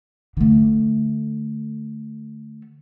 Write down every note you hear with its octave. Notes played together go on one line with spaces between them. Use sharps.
D3 A3